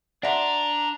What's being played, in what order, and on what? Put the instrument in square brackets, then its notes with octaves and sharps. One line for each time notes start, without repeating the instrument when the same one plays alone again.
[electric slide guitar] D4 [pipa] F#4 E5 C6 [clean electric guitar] D5 [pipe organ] A#5